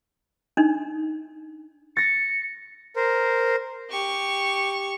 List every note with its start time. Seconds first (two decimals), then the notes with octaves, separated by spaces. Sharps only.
0.57 D4 D#4
1.97 A6 A#6 C#7
2.96 A#4 C5
3.90 G4 C#6